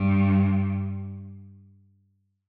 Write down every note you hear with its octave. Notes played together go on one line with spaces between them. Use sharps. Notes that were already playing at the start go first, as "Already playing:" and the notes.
Already playing: G2